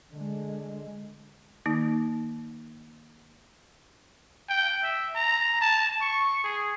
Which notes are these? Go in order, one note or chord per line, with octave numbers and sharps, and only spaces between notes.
D3 G#3
D#3 A#3 D#4
G5
E5
A#5
A5
C#6
G#4